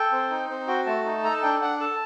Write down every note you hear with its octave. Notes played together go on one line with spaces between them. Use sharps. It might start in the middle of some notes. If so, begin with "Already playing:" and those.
Already playing: A4 G5
C4
D#4
C4
F#4 G5
A3 A5
D#4
A4 A#5
A5
D4 G5
D4 F#5
A4 A5